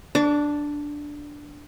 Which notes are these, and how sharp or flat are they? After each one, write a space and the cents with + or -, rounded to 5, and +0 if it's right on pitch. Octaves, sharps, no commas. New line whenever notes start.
D4 +0 D6 -40